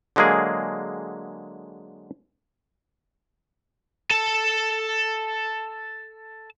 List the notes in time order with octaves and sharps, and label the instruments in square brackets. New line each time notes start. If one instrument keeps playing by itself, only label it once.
[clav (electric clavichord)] D3 F#3 G#3 A#3 G#4
[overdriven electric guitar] A4 A5